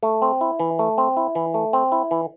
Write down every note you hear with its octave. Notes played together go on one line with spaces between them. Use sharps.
A3
C4
E4
E3
A3
C4
E4
E3
A3
C4
E4
E3